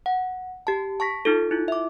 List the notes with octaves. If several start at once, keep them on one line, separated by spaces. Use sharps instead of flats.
F#5
G4 A5
A5 C#6 A#6 B6
D#4 F4 A4
E4 F4
E5 D6